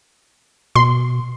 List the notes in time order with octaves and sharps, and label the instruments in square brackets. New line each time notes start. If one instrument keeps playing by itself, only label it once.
[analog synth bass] B2 [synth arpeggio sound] C6